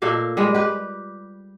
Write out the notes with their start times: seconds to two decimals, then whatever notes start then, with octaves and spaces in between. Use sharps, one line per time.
0.02 A#2 A3 A#3 F5
0.37 G3 G#3
0.54 G4 B4